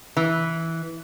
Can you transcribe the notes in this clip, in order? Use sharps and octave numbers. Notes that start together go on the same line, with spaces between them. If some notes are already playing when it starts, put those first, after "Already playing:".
E3